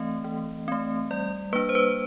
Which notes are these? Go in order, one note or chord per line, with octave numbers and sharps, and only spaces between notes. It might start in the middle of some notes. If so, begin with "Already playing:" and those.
Already playing: E3 A3 C4 D#5
E3
A3 C4
G3 D5
A#3 D4 B4
C5
B4